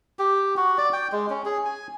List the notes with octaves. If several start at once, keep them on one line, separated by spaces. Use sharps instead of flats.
G4
F#4
D5
G5
G#3
C#4
G#4
G#5